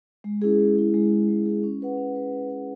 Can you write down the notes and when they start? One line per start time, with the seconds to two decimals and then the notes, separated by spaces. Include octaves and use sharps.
0.24 G#3
0.42 C#4 E4 G#4
0.59 G#3
0.76 C#4 E4 G#4
0.94 G#3
1.11 C#4 E4 G#4
1.28 G#3
1.46 C#4 E4 G#4
1.64 C#4
1.81 G#4 B4 F#5
1.97 C#4
2.15 G#4 B4 F#5
2.32 C#4
2.49 G#4 B4 F#5